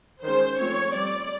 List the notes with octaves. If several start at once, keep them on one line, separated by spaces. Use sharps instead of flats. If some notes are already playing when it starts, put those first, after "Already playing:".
D#3 G#3 C#4 C5
F3 A3 C4 C#5
G3 C4 D5